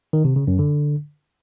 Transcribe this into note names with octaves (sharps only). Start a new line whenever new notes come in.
D#3
C3
C#3
F#2
D3